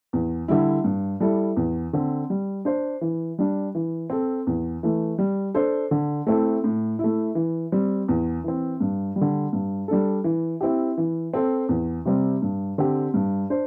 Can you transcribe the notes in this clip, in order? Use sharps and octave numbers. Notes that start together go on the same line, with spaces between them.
E2
D3 G3 E4
G2
G3 E4 A4
E2
D3 C4
G3
D4 C5
E3
G3 D4
E3
C4 A4
E2
E3 A3
G3
D4 A4 C5
D3
A3 C4 E4 A4
A2
A3 E4
E3
G3 C4
E2
E3 C4
G2
G3
D3
G2
G3 D4 A4
E3
C4 E4 G4
E3
C4 A4 C5
E2
C3 G3 C4
G2
D3 C4 G4
G2
D4 C5